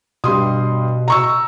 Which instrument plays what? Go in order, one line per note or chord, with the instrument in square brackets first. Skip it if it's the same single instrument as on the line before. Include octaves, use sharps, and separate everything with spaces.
[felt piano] G2 C6 D#6 [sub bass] B2
[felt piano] A#5 C#6 E6